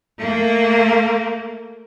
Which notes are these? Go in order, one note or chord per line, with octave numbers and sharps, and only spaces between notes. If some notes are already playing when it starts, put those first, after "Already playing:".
A3 A#3